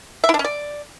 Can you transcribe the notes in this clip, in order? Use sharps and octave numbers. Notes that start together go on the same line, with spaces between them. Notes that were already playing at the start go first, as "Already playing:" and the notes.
E5
E4
D4
C#4
D5